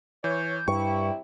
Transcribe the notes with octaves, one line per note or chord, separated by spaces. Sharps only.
E3 C#5 G6
G2 C3 G3 E4 G5 C#6